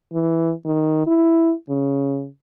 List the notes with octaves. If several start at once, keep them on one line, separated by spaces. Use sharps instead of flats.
E3
D#3
E4
C#3